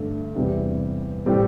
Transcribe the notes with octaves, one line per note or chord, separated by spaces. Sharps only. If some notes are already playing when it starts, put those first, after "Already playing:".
Already playing: G2 D3 A3
E2 C3 G3 E4 G4
A2 G3 C4 G4